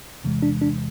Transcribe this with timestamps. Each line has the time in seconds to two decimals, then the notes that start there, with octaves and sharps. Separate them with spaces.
0.23 E2 C3 E3 G#3
0.42 D4
0.62 D4